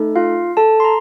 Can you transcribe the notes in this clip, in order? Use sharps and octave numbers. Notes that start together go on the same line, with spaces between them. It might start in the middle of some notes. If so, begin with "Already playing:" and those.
Already playing: A3 D#4 A4
F4 F5
A4 A5
C6
A#5